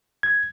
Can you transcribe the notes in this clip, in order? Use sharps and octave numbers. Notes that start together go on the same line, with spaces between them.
G#6